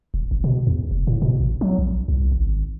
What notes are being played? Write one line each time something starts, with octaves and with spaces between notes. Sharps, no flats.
D#1
G#1
B2
E2
F1
A2
B2
A1
F#3
A#1
C2
G#1